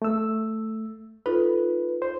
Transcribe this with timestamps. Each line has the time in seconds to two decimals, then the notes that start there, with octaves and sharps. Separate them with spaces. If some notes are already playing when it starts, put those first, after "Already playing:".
0.02 A3 E6
1.26 D#4 F4 A4 B4
2.02 C5